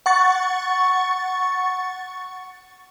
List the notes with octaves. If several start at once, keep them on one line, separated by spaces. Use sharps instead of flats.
F#5 C#6 A6